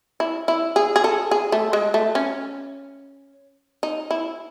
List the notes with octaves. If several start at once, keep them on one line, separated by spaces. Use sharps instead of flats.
E4
E4
G#4
G#4
A4
G#4
A3
G#3
A3
C#4
D#4
E4